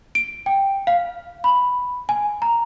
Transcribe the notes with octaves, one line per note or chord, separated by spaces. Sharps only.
D7
G5
F5
B5
G#5
A#5